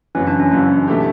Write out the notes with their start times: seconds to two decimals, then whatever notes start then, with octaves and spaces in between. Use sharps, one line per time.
0.15 F#1 F#2 E3 C#4
0.27 D4
0.40 C#4
0.51 F#1 F#2 E3 D4
0.88 B2 A3 E4 G4